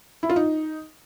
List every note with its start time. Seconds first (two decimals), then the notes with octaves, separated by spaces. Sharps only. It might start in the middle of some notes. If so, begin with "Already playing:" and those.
0.23 E4
0.29 F4
0.36 D#4